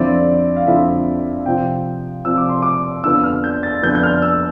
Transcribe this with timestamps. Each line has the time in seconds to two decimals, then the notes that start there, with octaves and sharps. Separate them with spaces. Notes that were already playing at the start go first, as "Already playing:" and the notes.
Already playing: F2 D3 F3 C4 E4 D5
0.56 F5
0.67 F2 D3 F3 C4 E4 E5
1.46 C3 F3 C4 G5
2.25 C3 F3 C4 E6
2.38 D6
2.49 C6
2.62 D6
3.04 F2 D3 F3 B3 E6
3.24 F6
3.44 G6
3.63 A6
3.83 F2 D3 F3 B3 G6
3.95 G6
4.03 F6
4.22 E6